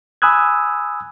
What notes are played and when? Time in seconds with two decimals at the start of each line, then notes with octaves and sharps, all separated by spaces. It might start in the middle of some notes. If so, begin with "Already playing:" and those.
0.22 G#5 B5 D#6 E6 F#6 G#6